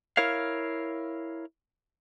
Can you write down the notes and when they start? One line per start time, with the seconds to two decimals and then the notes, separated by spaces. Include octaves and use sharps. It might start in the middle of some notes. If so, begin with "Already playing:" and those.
0.17 E4 A#4 C#5 F5